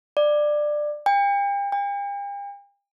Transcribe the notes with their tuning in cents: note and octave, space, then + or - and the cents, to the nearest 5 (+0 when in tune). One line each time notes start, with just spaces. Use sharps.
D5 +15
G5 +40
G5 +45